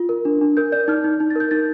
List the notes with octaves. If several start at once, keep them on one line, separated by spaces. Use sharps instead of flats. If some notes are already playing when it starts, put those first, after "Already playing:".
Already playing: F4
A#4
D4
D4
A#4 G6
D5 G6
D#4 F6
D#4
D#4
A6
A#4 G6
D#4 A6